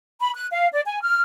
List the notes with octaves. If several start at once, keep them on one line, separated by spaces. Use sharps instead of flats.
B5
F#6
F5
D5
G#5
F6